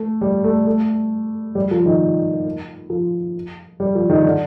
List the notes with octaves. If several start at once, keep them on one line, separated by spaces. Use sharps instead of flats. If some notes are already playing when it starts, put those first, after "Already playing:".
Already playing: A3
G3
A3
A3
G3
F3
D#3
F3
G3
F3
D#3
D3